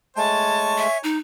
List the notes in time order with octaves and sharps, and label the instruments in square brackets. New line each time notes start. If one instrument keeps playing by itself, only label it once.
[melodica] G#3 A3 [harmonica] C#5 G#5 [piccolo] A5
[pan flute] E5
D#4